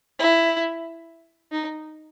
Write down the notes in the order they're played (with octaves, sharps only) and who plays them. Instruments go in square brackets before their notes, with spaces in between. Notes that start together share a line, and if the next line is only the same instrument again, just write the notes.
[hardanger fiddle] E4
D#4